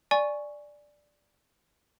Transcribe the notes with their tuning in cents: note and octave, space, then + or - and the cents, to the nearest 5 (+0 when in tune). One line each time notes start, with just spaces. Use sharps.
D5 +0 G#5 +0 C#6 +0